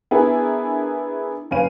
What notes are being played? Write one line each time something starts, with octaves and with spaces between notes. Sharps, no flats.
B3 D4 E4 G#4 A#4
F#1 C#4 B4 F5 D#7